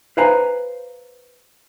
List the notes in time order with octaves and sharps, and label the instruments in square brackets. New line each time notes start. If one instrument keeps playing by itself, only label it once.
[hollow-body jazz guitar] B4 C5 F5 G#5 A#5 B5